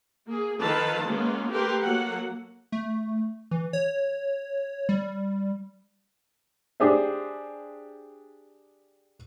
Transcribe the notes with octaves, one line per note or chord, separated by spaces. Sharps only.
A#3 G#4
D#3 F3 A4 B4 F5 A5
G#3 A#3 B3 C#4 F4
A3 G4 A#4 B4 C6
F#3 A#3 A4 F#5
A3
E3
C#5
G3
D4 G4 G#4 C5 E5